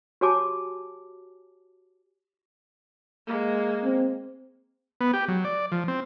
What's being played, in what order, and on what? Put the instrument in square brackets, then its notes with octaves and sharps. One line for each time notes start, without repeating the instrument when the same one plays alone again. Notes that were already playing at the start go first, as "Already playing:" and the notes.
[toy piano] F#4 G4 C#5 G#5 A5 D6
[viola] G#3 A#3
[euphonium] C4
[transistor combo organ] B3
G4
F#3
D5
F3
C4